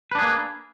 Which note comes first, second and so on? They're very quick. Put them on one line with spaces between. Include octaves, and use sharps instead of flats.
B4 D4 G#4 A#3